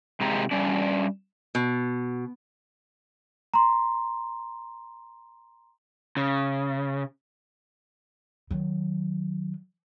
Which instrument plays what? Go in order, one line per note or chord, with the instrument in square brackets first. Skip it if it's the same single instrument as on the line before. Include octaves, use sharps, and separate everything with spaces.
[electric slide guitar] C3 G#3 G4 A#5
G3 C#4 D4
[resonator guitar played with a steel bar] B2
[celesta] A#5 C6
[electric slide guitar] C#3
[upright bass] D#3 F#3